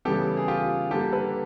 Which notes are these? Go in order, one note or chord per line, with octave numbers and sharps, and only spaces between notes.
C#3 E3 G3 B3 G4 A4
G#4
F4 G4
D3 G3 A#3 G4 A4
A4 B4